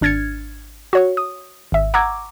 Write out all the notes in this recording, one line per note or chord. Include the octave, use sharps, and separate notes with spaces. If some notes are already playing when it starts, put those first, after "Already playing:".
G#1 D4 F6 G#6 A6 C#7
F#4 C#5 C#6
D#6
G#1 E5
F#5 A#5 C#6 D6 E6 G#6